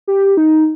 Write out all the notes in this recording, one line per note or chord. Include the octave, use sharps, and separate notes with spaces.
G4
D#4